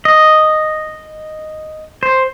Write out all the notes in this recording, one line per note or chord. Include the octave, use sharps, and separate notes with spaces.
D#5
C5